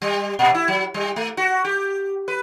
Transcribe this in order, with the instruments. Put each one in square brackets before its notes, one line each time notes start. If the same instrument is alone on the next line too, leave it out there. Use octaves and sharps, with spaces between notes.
[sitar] G3
A#2
E4
F#3
G3
A3
F#4
G4
B4